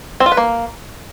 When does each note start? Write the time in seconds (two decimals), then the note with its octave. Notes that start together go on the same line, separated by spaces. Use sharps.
0.20 C4
0.26 F4
0.32 B4
0.37 A#3